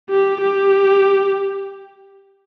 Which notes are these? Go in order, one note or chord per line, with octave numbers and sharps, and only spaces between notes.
G4
G4